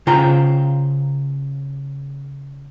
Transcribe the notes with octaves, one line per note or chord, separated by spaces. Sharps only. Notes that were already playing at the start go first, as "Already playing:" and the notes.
C#3 F4 C5 G5 A#5